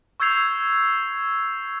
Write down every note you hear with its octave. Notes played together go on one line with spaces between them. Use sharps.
C#6 E6 G6 G#6 C7 F7